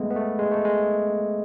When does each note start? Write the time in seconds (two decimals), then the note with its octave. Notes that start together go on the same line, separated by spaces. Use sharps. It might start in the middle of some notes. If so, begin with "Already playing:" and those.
Already playing: G#3 A3 B3
0.10 B3
0.16 A3
0.39 G#3
0.51 A3
0.65 G#3